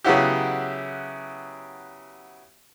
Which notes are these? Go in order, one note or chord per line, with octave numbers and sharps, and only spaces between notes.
C#3 F#3 B3 E4 F#4 G4